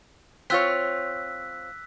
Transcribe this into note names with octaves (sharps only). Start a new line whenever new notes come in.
C4 F4 C#5 E6 F#6 B6